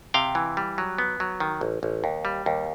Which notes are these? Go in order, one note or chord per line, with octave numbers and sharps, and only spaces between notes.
C3 F5 G5
E3
G3
F#3
B3
F#3
D#3
A1
A1
D#2
G3
D#2